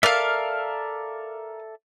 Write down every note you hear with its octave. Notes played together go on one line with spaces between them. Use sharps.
A4 A#4 D5 E5 F5